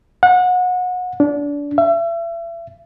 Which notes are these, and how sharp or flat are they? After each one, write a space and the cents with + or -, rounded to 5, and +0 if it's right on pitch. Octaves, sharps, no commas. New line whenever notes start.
F#5 -30
D4 -25
E5 +35